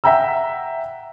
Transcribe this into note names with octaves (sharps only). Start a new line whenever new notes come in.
E5 F#5 G5 A#5 E6